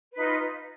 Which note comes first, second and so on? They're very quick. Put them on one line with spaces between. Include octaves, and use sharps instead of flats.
B4 D#4 F4